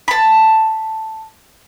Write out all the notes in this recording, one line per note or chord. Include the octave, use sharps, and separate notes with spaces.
A5 B5